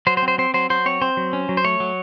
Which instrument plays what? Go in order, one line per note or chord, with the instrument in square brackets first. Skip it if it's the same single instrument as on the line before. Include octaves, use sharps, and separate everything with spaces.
[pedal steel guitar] F#3 C5
C5
C4
C5
C4 C5
F#3 C5
F#3 C5
C4 C#5
C4 C5
F#3
C#4
F#3
C5
A3 C#5
F#3